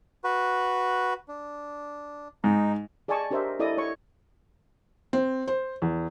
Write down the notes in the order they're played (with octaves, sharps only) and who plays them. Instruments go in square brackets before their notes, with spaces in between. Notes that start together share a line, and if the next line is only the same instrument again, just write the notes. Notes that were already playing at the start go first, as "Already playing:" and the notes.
[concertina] F#4 B4
D4
[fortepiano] G#2 [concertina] D#4
[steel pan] G#4 D5 D#5 G#5 A5 C#6
D4 G4 A#4 C5 D#5 E5
E4 A4 D5 D#5 D#6
C#5 C#6
[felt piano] C4
C5
E2